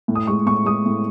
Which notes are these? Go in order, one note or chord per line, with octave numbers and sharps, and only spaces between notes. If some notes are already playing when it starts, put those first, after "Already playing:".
A2
D#6
G#3 C#6
A2 C#6
G#3 D#6
A2